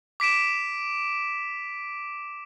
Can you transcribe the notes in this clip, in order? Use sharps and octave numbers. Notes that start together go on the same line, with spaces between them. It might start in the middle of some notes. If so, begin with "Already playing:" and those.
D6 B6 D7 E7